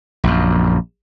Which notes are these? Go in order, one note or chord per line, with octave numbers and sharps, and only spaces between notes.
A#1 F#2